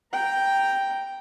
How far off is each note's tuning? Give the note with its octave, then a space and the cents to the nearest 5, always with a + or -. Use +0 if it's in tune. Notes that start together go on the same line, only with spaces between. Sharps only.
G5 +0 A#5 +0